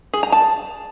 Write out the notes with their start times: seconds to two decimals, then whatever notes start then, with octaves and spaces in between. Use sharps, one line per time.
0.14 G#4
0.23 A#5
0.32 A5